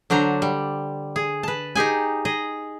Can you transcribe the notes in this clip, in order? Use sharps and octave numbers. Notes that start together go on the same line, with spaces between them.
D3 F#3 D4 C5 A#5
G3
G#4
B4 A5
D#4 G4 G#4 G#5
G#4 D#5